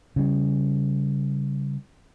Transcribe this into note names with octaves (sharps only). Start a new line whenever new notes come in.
C#3 G3